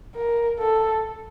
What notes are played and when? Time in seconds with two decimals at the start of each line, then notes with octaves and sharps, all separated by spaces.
0.15 A#4
0.59 A4